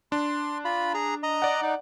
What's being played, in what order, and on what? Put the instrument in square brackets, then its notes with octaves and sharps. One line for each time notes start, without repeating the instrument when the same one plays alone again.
[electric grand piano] D4 [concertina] C6
[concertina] F4 B5
G#4 A#5
D#5 A#5
[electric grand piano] D5 F#5
[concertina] D#4